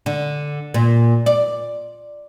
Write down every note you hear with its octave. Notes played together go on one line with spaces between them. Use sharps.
D3
A#2
D5